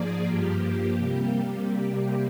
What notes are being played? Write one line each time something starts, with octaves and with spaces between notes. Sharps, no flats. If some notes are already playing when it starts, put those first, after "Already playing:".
Already playing: G#2 F3 A#3 G#4 D5
G2 F3 A#3 G4
C3 G3 A#3
G4